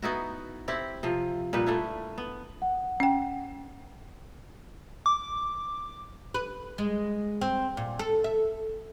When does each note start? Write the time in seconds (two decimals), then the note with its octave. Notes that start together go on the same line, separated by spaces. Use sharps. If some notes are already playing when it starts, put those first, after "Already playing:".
0.02 B3 D#4 E4 F#4
0.68 C4 E4 G4
1.03 C3 F3
1.53 A#2 G3 D#4 B4
1.66 A3 D4 E4
2.18 B3
2.62 F#5
3.00 C#4 G5
5.06 D6
6.34 B4
6.78 G#3
7.41 C4
7.77 A#2
7.99 A4
8.24 E5